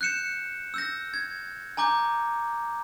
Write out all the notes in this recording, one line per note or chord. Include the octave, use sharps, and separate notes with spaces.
F#6 G6 C#7 E7
E6 G6 A#6
G#6
G#5 A#5 D6 G6